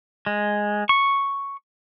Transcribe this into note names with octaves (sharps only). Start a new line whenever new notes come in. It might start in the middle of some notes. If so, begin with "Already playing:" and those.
G#3
C#6